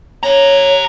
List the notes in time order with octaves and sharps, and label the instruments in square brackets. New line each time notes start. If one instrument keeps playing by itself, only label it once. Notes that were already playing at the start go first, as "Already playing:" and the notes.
[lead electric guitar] G4 A#5 [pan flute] C#5